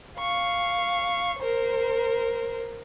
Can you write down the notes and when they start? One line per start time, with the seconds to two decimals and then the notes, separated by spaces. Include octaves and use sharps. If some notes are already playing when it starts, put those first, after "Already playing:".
0.19 F5 C#6
1.39 A#4 C5